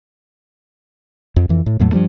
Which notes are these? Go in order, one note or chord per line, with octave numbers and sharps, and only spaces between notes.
F2
F2 E3
A2
E2 A2 F#3 A3
G2 F3 G3 A3